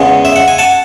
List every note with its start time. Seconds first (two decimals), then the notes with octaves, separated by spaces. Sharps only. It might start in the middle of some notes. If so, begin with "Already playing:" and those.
Already playing: E2 C#3 G#3 B3 D#5 F#5
0.25 E5
0.36 F#5
0.48 G#5
0.58 F#5 A5